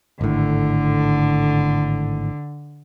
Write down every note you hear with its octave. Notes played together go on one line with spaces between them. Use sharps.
G#1 A2 D3